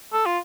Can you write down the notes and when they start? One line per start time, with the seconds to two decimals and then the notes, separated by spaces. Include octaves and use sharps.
0.13 A4
0.26 F4